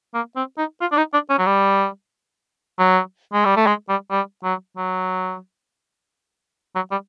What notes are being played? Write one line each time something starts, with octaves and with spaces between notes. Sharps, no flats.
A#3
C4
D#4
F4
D4
D#4
D4
C#4
F#3
G3
F#3
G#3
G3
A3
G#3
G3
G3
F#3
F#3
F#3
G3